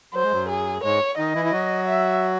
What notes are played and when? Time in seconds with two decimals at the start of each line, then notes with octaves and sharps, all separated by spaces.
0.14 F#3 C5
0.23 G#3
0.32 F#2 F#3
0.49 G#4
0.84 G#2 G#3 C#5
1.17 D#3 D#4 D#5
1.35 E3 E4
1.45 E4
1.52 F#3 F#4
1.88 E5